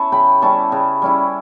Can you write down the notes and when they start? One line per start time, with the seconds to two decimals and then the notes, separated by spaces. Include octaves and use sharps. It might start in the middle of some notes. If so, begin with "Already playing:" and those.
Already playing: C#4 E4 A5 C#6
0.12 C#3 G5 B5
0.42 G3 C#4 E4 A5 C#6
0.72 C#3
1.02 G3 C#4 E4